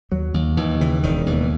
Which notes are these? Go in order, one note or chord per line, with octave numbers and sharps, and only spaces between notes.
D#2 F#3
D#2
D#2 E3
C#3 E3
E1 D#3
D#2 E3